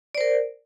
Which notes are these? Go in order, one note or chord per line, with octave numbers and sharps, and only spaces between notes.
A#4 C5 D5